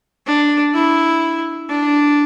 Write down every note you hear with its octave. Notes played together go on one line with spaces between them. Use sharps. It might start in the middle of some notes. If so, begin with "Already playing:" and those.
D4
E4
D4